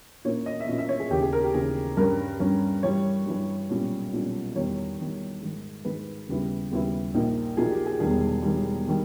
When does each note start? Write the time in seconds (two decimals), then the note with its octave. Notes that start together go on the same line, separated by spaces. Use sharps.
0.25 A#2 A#3 C#4 E4 C#5
0.46 D#5
0.60 E5
0.68 A#2 A#3 C#4 E4 D#5
0.78 E5
0.89 C#5
1.00 G#4
1.10 D#2 C#3 E3 G4
1.22 G#4
1.33 A#4
1.43 G4
1.54 D#2 C#3 E3 G#4
1.97 G2 G3 C#4 A#4
2.40 G2 G3 C#4
2.83 G2 E3 G3 C#5
3.26 G2 E3 G3
3.69 B1 A#2 G3 C#4
4.13 B1 A#2 G3 C#4
4.56 E2 D#3 G3 C#5
4.98 E2 D#3 G3
5.42 G#2 D#3 G#3
5.85 G#2 D#3 G#3 B4
6.28 D#2 C#3 G3 B3 E4
6.71 D#2 C#3 G3 B3 E4
7.14 A#1 A#2 A#3 D#4
7.57 A#1 A#2 A#3 D#4 G#4
7.71 G4
7.86 G#4
8.00 E1 E2 D#3 G3 G#4
8.43 E1 E2 D#3 G3
8.88 D#3 G3